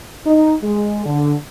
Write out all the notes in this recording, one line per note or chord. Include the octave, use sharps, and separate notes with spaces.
D#4
G#3
D3